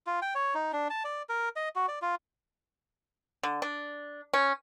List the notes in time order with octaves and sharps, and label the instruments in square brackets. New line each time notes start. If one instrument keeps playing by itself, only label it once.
[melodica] F4
G5
C#5
D#4
D4
A5
D5
A#4
D#5
F#4
D5
F4
[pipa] D3
D4
C#4